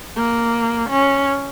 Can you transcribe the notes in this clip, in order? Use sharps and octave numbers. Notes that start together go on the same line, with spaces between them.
A#3
C#4